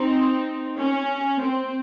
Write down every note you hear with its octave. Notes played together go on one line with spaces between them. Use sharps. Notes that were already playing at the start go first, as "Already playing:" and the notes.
Already playing: C4 D#4
C#4
C4